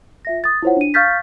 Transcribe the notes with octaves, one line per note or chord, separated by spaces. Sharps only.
F4 E5 A#6
D#6 A6
E4 F4 C5 C#5 F#5
D4 D#7
F5 C#6 F6 G6 A6 B6